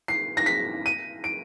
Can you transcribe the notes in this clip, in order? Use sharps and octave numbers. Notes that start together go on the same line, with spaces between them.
C7
A#6
B6
D#7
D7